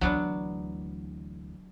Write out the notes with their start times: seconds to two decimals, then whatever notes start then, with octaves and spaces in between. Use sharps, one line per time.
0.01 D2 E3 F#3 B3 D4